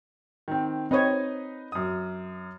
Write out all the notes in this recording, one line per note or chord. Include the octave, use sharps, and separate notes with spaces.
D#3 C4
C4 D#4 B4 C#5 D#5
F#2 D#6